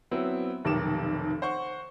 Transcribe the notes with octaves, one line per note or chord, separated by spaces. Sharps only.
F#3 B3 C4 E4
F1 B1 D#3 G4 D6 E7
C5 F#5 C#6